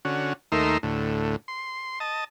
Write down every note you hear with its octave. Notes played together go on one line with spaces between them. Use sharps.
D3 C#4 F#4
D#2 A3 D#4 A#4 E5 C6
D2 A2
C6
D#5 A5